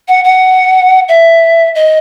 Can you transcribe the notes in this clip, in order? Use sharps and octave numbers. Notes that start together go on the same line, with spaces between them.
F#5
F#5
E5
D#5